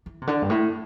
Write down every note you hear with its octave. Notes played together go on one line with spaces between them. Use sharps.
E3
C3
D3
G2
A2